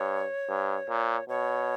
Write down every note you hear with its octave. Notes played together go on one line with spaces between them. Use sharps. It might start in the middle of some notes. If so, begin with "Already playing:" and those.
Already playing: G2 C#5
G2
A#2
B2 C#5